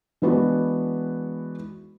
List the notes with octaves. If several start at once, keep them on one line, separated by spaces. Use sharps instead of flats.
E3 G#3 B3 D4 F#4